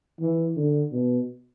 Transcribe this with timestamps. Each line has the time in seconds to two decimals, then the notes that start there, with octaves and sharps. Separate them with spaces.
0.20 E3
0.56 D3
0.92 B2